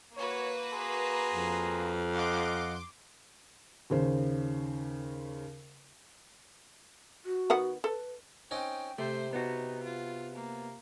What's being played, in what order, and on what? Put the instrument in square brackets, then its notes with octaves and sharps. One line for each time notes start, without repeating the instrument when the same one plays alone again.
[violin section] A#3 F#4 B4 [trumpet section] C#5
[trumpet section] G#4 A#5 C6
[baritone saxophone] F2
[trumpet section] F4 D#5 F#5 [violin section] C6 D6
[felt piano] D#2 C#3 C5
[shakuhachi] F#4
[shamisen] D#3 B3 F#5
[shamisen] A4 [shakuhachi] B4
[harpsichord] C4 C#4 D#4 [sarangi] G5
[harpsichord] C3 [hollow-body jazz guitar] A3 [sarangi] C5
[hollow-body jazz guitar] B3 F#4 [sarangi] D#4
[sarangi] F4
A#3